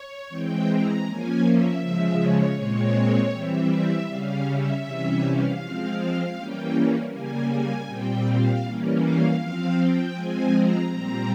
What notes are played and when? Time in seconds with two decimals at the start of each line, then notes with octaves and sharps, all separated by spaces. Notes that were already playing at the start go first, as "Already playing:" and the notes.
Already playing: C#5
0.29 E3 G#3 C4 G5
0.67 A#5
1.05 F3 A#3 C#4 G#5
1.44 E5
1.80 C#3 F3 G#3
2.19 C#5
2.56 A#2 G#3 C4 C#5
3.32 E3 G3 C4 E5
3.70 E5
4.08 C#3 G3 C#4 F5
4.46 E5
4.83 C3 E3 G3 C#4
5.22 F5
5.59 F3 G#3 C4
6.35 E3 G3 A#3 C#4 G5
7.11 C#3 G3 A#3 G#5
7.49 G#5
7.86 A#2 G3 C4 G5
8.24 F5
8.62 E3 G3 A#3 C#4
8.99 F5
9.37 F3 C4 F5
9.76 G5
10.13 F3 G#3 C4 G#5
10.51 A#5
10.89 A#2 G3 C4 A#5